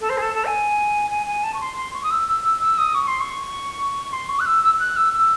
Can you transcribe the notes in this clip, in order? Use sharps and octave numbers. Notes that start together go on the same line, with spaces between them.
A4
C5
G#4
A4
A4
G#5
G#5
G#5
A5
C#6
C6
C6
C#6
D#6
E6
E6
E6
E6
D#6
C#6
C6
C#6
C6
C#6
F#6
E6
E6
E6
F#6
E6
E6